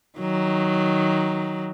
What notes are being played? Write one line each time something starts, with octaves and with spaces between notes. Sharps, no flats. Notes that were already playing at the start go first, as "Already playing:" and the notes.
D#3 F#3